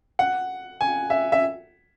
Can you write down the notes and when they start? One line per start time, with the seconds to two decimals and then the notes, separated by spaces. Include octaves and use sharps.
0.19 F#5
0.81 G#5
1.10 E5
1.32 E5